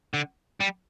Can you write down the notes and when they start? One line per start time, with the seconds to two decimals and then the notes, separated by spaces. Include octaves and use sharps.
0.14 D3
0.60 G3